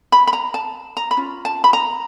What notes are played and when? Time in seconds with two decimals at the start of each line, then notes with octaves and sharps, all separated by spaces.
0.12 B5
0.27 B5
0.33 A#5
0.54 A5
0.97 A#5
1.11 B5
1.17 C#4 F4
1.45 A5
1.64 B5
1.73 A#5